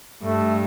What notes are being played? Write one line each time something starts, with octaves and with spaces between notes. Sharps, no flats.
G2 A3